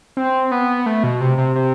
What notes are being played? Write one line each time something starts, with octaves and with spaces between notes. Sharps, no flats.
C4
B3
A3
B2
C3
C3
C3